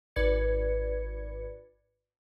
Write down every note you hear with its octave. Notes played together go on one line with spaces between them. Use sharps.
G#1 B4 D5 G#6 C#7